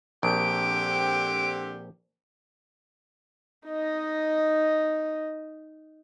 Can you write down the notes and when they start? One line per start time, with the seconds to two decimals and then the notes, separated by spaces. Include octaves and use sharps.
0.23 A#1 D3 C4 G4 D7
3.68 D#4 D#5